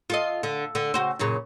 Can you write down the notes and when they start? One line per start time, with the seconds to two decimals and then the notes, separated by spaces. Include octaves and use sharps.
0.10 F4 A4 D#5
0.43 D3
0.75 D3
0.94 C#3 F#4 C5
1.19 F#2 A#2 C#3